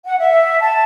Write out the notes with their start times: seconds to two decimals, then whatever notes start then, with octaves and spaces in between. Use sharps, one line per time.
0.04 F#5
0.19 E5
0.61 A5